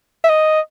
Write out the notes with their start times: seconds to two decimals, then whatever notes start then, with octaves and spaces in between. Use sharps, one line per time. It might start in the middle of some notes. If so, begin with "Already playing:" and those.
0.24 E5
0.30 D#5